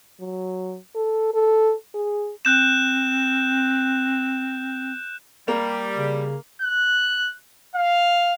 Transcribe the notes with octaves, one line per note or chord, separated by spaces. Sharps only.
F#3
A4
A4
G#4
C4 F#6 G6 E7
G3 A#3
C#3
F#6
F5